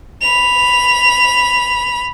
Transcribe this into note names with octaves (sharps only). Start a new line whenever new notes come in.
B5 F7